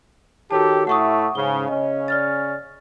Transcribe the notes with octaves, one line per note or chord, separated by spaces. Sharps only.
D#3 F#4 G4 A4 C#5 A5
A2 A3 E4 F#5 C#6 D#6
G#2 C#3 G7
C#3 C#4 D#5
D5 F6 A6